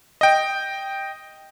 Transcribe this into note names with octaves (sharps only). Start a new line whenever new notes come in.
D#5 G5